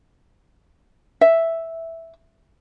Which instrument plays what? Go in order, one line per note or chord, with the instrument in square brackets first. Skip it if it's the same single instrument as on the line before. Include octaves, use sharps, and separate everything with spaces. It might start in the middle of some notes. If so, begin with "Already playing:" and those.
[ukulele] E5